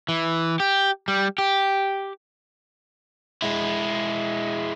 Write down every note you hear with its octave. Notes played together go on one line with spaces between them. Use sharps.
E3
G4
G3
G4
G#3 E4